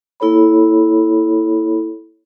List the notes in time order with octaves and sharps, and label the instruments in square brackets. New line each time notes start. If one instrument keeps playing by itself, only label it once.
[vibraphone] A#3 E4 A4 C#5 B5